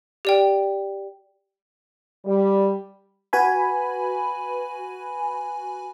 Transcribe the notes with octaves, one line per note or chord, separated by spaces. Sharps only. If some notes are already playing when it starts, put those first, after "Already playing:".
G4 D5 G5
G3
F#4 B4 G#5 B5